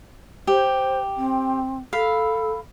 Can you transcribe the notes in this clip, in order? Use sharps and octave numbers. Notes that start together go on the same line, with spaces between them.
G4 C5
C4
A4 F5 B5